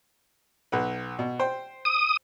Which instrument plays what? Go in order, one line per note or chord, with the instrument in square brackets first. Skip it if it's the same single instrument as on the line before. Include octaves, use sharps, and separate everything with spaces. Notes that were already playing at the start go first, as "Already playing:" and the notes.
[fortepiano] B1 B4
B2
C5 G5
[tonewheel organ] D#6